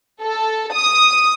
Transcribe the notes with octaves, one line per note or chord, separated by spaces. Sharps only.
A4
D#6